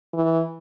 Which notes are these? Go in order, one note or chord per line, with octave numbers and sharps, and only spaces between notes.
E3